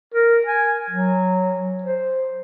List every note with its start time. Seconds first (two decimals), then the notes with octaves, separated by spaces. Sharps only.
0.14 A#4
0.47 G#5
0.90 F#3
1.83 C5